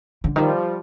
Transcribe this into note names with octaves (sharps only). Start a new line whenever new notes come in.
D3
D#3 F3 G3